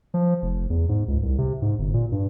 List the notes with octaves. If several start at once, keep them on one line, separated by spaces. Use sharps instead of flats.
F3
F1
E2
G#2
C#2
C2
C3
G#2
G1
A#2
G2